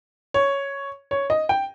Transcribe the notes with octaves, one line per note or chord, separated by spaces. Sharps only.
C#5
C#5
D#5
G5